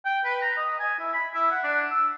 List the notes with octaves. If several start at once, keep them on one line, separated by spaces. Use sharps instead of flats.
G5
B4
A#5
D#5
G#5
E4
B5
E4
F#5
D4
E6